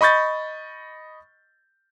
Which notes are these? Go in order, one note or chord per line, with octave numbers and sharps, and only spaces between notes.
D#5 B5 C#6 G6 A6